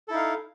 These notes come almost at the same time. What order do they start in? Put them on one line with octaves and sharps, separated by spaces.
A4 E4 D#4 F5